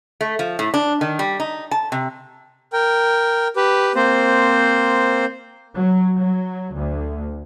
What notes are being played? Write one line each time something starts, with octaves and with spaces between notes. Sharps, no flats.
A3
F3
A2
D4
D#3
G3
D#4
A5
C3
A#4 G5
G4 B4
A#3 C4 C5
F#3
F#3
D2